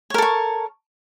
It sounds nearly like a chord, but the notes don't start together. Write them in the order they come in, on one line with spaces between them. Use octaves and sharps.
C#5 A#4 A4 C#6